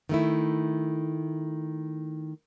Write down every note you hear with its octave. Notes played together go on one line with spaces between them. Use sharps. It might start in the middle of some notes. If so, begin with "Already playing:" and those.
D#3 A3 E4